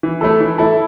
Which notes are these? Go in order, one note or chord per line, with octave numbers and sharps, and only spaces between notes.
E3
A3 E4 A4
E3
A3 E4 A4